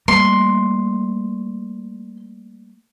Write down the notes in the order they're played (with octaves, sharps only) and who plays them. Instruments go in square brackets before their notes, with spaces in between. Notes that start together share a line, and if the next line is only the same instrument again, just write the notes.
[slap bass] G3 A3 A#3 [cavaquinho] C6